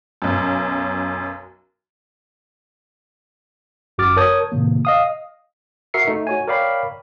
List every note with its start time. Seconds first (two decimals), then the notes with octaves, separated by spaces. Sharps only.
0.22 B1 F#2
3.98 G1 F#2 F#4 D6 F6 A6
4.17 A#4 C#5 A5 D#6 G6 G#6
4.52 A2 C3 D#3 A#3
4.85 D#5 F5 D#6
5.94 F#4 A#4 E5 C7 C#7
6.07 A3 D#4
6.27 F#4 C#5 G#5
6.48 A#4 C#5 D5 F5 G5 B5